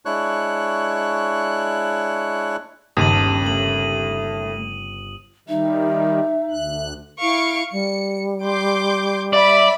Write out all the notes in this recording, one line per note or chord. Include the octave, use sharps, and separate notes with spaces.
G#3 D4 E4 C#5 C#6 F#6
G1 D#2 C#3 A5 D#6 D#7 F#7
A3 F#7
D#3 G3 D#4 E5
D2 F#6
E4 F5 C#6 D7
G3 C#7
C6 D6 G6
D5 E5 B5